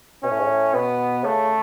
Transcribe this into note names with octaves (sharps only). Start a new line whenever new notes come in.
B2 C#4
A2
G#2
A2
B2 B3
C#3 A3